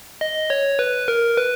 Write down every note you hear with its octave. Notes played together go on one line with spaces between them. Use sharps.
D#5
C#5
B4
A#4
B4